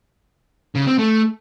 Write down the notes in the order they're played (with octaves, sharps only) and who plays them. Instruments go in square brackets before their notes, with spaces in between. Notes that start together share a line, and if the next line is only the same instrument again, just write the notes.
[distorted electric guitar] C#3
C4
A3